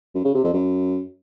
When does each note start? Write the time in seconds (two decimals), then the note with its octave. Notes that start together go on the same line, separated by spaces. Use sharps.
0.15 F#2
0.25 C#3
0.34 C3
0.44 F2
0.53 F#2